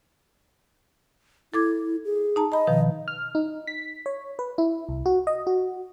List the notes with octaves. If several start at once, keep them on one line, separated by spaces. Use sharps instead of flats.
E4 A4 D6 G#6
G#4
D#4 A5 A#5
D#5 A#5 B5
B2 D#3 F3
F6
D#4
B6
C#5
B4
E4
C2
F#4
D#5
F#4